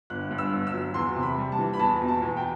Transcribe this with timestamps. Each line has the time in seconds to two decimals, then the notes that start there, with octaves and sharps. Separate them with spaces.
0.10 G1 F#6
0.31 G2
0.38 E6
0.53 G1
0.67 E6
0.73 F#3
0.94 E2 C6
1.16 C3
1.23 B5
1.38 G3
1.52 A5
1.59 E3
1.73 B5
1.79 E2 A5
2.02 B2
2.08 A5
2.22 E2
2.37 G5